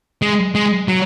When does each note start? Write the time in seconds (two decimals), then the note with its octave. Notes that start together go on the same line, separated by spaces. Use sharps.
0.22 G#3
0.55 G#3
0.88 F#3